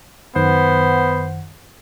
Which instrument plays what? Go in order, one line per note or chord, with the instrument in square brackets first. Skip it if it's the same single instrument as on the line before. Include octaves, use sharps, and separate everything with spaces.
[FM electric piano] F#2 D#3 F#5 [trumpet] B3 [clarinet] C5